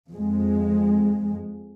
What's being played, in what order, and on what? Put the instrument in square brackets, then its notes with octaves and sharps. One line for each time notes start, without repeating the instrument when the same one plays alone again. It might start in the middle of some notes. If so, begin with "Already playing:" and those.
[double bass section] F2 G#3